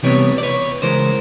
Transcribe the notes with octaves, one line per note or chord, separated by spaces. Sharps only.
C3 E3 G3 B3 B4 C#5
D5
B4 C#5
C#3 E3 G#3 A#4 C5